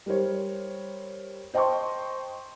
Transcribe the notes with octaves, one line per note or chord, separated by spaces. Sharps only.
G3 A#4 C5 C#5
C5 D#5 G5 A5 C6 C#6